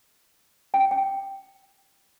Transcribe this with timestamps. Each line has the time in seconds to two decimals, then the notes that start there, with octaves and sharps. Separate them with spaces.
0.74 G5
0.91 G5